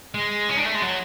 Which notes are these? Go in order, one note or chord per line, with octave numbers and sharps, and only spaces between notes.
G#3
C#4
D4
A3
G#3
F#3